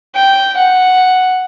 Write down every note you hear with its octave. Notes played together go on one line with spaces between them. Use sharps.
G5
F#5